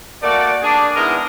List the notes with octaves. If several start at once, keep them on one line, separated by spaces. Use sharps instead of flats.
A3 A#3 F#4 D5
D4 G#4
G#3 B3 D#4 E4 A#4 D#5